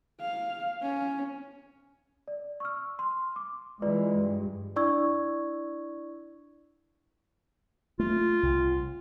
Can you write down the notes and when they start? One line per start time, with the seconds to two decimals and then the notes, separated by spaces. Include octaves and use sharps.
0.21 F5
0.82 C#4
2.28 D5
2.60 C#6 E6 F6
2.99 C6
3.36 D6
3.82 E3 G#3 F4 B4 D5
4.14 G2
4.76 D4 E4 D5 C#6 E6 G#6
7.99 A3 F4
8.43 C2